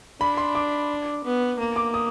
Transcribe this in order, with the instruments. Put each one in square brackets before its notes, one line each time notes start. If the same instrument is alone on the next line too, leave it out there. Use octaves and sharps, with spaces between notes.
[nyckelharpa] D4 [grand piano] B5
[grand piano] C6
D6
[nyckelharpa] B3
A#3
[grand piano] D6
D#6